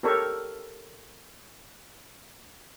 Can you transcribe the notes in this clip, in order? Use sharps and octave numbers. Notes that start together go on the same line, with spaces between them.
G4 A4 A#4 C#5